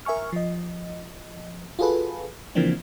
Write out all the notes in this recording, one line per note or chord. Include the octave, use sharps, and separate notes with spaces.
A#4 E5 G#5 C#6 F6
F3 D#5
F4 F#4 G#4 A4 B4
C#3 E3 F3 A#3 C4 D4